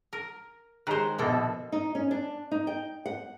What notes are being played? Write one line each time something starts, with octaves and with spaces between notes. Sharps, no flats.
A#4
D#3 G#3 C5 A#5 F#6
A#1 B2 A#3 A4
D#4
C#4
D4
D#4
G5
F#5